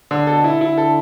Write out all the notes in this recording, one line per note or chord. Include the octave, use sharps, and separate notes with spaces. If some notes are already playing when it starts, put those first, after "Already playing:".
D3
B2 A4
E4
D3 E4
A4